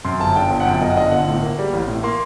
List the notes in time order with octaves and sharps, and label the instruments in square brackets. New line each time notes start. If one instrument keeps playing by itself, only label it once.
[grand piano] F#2 C6
G1 A5
D3 G5
G1
F#5
F#2 G5
G1 D#5
F#5
D3 D#5
G1 F#5
A2
A#3
G3
A1
A2
A#3 C6